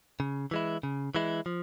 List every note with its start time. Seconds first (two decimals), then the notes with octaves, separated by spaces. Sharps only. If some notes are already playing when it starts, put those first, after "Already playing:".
0.20 C#3
0.51 E3 G#3 E4
0.83 C#3
1.15 E3 G#3 E4
1.46 F3